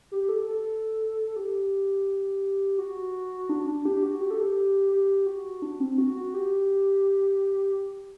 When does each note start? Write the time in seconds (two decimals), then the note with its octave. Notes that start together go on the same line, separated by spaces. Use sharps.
0.12 G4
0.29 A4
0.46 A4
1.36 G4
2.78 F#4
3.49 D4
3.66 D4
3.85 G4
4.03 F#4
4.21 G4
4.30 A4
4.41 G4
4.92 G4
5.26 F#4
5.62 D4
5.80 C4
5.98 F#4
6.16 F#4
6.34 G4